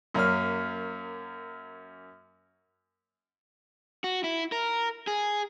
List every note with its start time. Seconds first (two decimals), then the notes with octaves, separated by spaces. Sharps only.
0.14 F#2 A#3 C#4 F6
4.04 F#4
4.24 E4
4.52 A#4
5.07 G#4